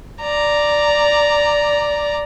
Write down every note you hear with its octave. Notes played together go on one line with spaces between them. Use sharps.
D5 A#5